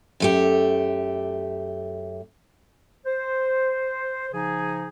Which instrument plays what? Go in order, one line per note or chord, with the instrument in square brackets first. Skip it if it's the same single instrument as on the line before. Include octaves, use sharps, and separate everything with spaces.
[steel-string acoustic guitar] F#2 A3 G4
[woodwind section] C5
C#3 F3 D#4 G#4